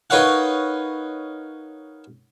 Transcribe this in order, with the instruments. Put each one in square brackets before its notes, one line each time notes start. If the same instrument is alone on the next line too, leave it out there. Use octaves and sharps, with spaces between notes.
[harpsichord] D#4 A#4 B4 C#5 F5 F#5